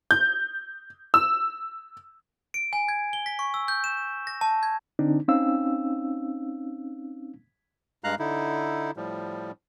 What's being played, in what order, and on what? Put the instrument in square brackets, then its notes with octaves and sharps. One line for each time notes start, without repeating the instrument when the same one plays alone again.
[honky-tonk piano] G6
E6
[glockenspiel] D7
G#5
G#6
G7
B6
C#6
E6
G6
E7
A#6
A5
G#6
[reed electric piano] D3 C4 D4 D#4
C4 C#4 D#4 F5 E6
[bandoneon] G2 G#3 F5 A#5 F#6
D3 D#4 E4
A2 F3 G3